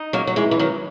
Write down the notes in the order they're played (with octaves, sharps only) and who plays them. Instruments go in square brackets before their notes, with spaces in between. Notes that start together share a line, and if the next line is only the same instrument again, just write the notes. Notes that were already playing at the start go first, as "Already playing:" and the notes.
Already playing: [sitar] D#4
[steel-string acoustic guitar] F#3 A#3
F#3
E3 G#3
E3
D#3 F#3